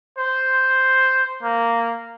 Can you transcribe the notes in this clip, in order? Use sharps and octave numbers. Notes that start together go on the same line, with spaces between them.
C5
A#3